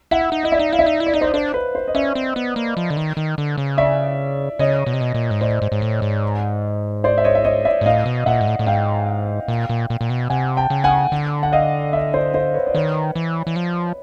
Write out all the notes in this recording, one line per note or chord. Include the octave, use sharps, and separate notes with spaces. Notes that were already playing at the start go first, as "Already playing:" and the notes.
E4 E5 F#5
D#4
E4 D#5
D5 E5
D#4
E4 F5
D5 E5
D#4
E4
D5
D#4 D#5
C5 D5
D4 C5
B4
C5
D#5
C#4 D5 E5
C4
B3
A#3
F3
D3
D#3
D#3
D3
C#3
D5 E5
C#3 C#5 D#5
B2
C3
B2
A#2
G#2
A2 C5 D5
G#2
G#2
A2
G#2
C5 D5
E5
C#5 D#5
E5
C#5 D#5
D5 E5
G#2
A2 D#5 F5
B2
A#2 E5 F#5
G#2
A2
A2
G#2 F5 G5
A#2
A#2
A#2
A#2
B2
C3 F#5 G#5
G5 A5
C#3
F#5 G#5
D3
F#5
D#5 F5
D5 E5
C5 D5
C5
B4 C#5
D5
D#3 B4 C#5
E3
E3
F3